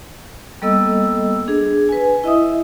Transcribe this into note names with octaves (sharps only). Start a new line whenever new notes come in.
G3 A#3 B3 A4 D#5 E6
D4 G#4
B4 G#5
E4 D#5 E5 D#6